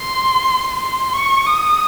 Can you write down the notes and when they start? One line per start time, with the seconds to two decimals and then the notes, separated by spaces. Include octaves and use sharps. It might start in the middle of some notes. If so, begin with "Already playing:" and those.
Already playing: C6
0.79 C6
1.13 C#6
1.47 D#6